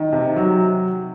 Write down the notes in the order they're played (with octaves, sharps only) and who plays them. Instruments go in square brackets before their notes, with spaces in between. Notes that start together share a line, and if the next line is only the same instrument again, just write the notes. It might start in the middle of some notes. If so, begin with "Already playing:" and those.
Already playing: [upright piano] D#3
C3
F#3